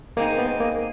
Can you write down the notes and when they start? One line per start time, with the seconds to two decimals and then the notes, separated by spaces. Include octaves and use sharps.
0.17 G#3 A#3 C4 D#4
0.38 B3
0.60 A#3